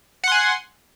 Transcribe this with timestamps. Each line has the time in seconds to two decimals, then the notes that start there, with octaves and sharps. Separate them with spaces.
0.24 F#5
0.28 C6
0.32 G#5